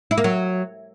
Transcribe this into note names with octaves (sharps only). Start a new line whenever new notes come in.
E4
A#3
F#3